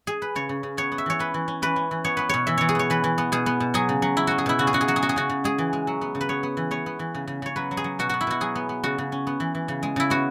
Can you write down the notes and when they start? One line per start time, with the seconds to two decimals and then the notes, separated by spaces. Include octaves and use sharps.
0.07 G#4
0.22 B4
0.35 C#3 C#5
0.49 C#3
0.63 C#3
0.77 B3 C#5
0.92 B3
0.98 E5
1.06 E3 C#5
1.19 C#4 B4
1.34 E3
1.48 C#4
1.62 E3 B4
1.76 C#4
1.91 E3
2.04 B3 C#5
2.17 B3 B4
2.29 B2 C#5
2.47 E3 E5
2.58 E3 C#5
2.69 G#4
2.75 B3 C#5
2.90 E3 B4
3.04 E3
3.18 B3
3.32 B2 G#4
3.46 B3
3.60 B2
3.74 F#3 G#4
3.89 C#3
4.02 F#3
4.17 C#4 E4
4.27 C#4 F#4
4.38 G#4
4.46 B2 E4
4.59 C#3 F#4
4.67 G#4
4.73 C#3 F#4
4.81 G#4
4.88 F#3 F#4
4.96 G#4
5.02 C#4 F#4
5.09 G#4
5.16 C#3 F#4
5.29 C#3
5.44 G#3 G#4
5.58 E3
5.73 G#3
5.87 F#3
6.01 B3
6.15 C#3
6.21 B4
6.29 B3 C#5
6.43 B3
6.57 E3
6.71 B3 C#5
6.86 B3
6.99 E3
7.15 C#3
7.27 C#3
7.42 C#3 C#5
7.56 F#3 B4
7.71 F#3
7.77 G#4
7.84 F#3
7.99 B2 F#4
8.09 B3 F#4
8.21 E4
8.27 B2 F#4
8.41 F#3 G#4
8.55 B3
8.69 B3
8.84 C#3 F#4
8.98 C#3
9.12 C#4
9.27 B3
9.40 E3
9.55 E3
9.68 C#3
9.83 G#3
9.96 C#3 E4
10.10 B3 F#4